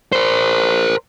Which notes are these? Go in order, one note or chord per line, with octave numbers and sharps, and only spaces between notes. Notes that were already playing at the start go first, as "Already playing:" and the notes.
A#4 C5